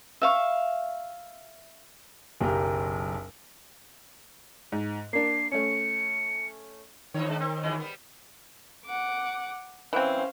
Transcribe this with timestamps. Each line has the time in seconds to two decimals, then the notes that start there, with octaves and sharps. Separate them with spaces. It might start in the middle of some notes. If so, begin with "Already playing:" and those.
0.22 E5 F5 C#6
2.41 F#1 B1 G4 A#4
4.72 G#2
5.13 A#3 D4 C7
5.52 A3 C#4 C#7
7.14 G2 D#3 E3 C#5
7.28 G#3 D4
7.40 C4
7.63 F2 E3 G#3
7.80 G3 B3
8.86 F#5 D6
9.93 E3 C4 C#4 C5 F5